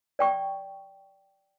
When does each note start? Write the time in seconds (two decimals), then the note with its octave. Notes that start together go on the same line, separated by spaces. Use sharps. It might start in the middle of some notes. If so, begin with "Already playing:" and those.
0.19 D5 G5 C#6